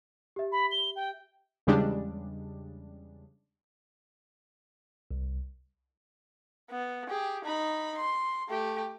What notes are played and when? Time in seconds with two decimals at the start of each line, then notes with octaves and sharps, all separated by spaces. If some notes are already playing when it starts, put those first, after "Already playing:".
0.36 G4 E5
0.52 B5
0.71 G7
0.95 G5
1.67 E2 C#3 G3 G#3 D4
5.11 C2
6.70 B3
7.09 G4 G#4
7.44 D#4 B5
7.98 C6
8.49 A3 G4